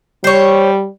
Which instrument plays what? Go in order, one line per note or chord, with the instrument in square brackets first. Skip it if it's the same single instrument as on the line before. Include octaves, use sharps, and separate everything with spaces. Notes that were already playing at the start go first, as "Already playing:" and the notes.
[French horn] G3 [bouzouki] C5 C#5